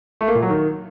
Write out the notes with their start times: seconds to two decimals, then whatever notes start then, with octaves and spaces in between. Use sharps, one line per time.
0.21 A3
0.28 A#3
0.35 A#2
0.42 F#3
0.50 D#3